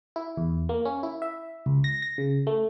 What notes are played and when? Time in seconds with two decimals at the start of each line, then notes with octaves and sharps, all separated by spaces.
0.16 E4
0.37 E2
0.69 A#3
0.85 C#4
1.03 E4
1.22 E5
1.66 C#2
1.84 A#6
2.02 A#6
2.18 C#3
2.47 A3